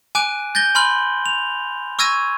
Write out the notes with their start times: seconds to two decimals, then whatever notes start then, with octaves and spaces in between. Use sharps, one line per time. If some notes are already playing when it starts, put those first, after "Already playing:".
0.15 G#5 D6 F#6 D7 D#7
0.55 G6 A6 A#6 G7
0.75 G#5 B5 C6 F6 F#7
1.26 F7
1.99 C#6 E6 F6 G#6 A#6 D#7